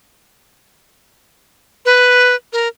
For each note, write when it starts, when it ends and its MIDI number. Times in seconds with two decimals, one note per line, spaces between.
1.85 2.35 71
2.53 2.68 70